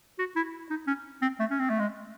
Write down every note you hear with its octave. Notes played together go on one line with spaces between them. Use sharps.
F#4
E4
D#4
C#4
C4
A3
C#4
C4
A3
G#3